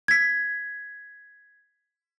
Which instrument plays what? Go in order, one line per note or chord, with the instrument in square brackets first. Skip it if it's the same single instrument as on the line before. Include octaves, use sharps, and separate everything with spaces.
[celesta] G#6 B6